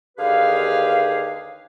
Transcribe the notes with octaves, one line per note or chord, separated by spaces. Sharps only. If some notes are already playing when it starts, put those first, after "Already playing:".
D#2 D3 G4 G#4 B4 F5